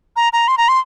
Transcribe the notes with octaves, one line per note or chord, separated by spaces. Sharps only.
A#5
A#5
C6
A#5
C6